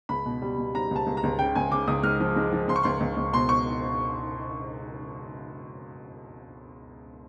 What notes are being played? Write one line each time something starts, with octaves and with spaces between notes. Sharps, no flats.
C#2 B5
B2
G3
B2
G3 A#5
C#2 A5
C#2
A#5
C#2
C#3 G5
C#2 G#5
C#3 D6
C#2 D#6
G#3 F6
F3
G#3
F3
C#2 C6
C#6
C#2 C6
C#2
C#2
B2 C6
C#6